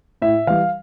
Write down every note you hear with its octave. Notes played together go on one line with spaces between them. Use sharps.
A2 E5
E3 G3 F5